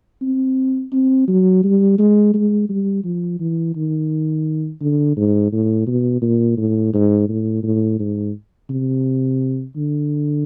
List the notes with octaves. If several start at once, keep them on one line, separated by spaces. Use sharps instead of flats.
C4
C4
F#3
G3
G#3
G#3
G3
F3
E3
D#3
D3
G#2
A2
B2
A#2
A2
G#2
A2
A2
G#2
C3
D3